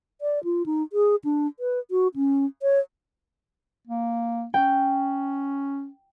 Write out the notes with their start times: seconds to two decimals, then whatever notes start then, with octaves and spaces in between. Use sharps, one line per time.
0.21 D5
0.44 F4
0.66 D#4
0.93 G#4
1.24 D4
1.60 B4
1.91 F#4
2.16 C#4
2.62 C#5
3.87 A#3
4.54 C#4 G5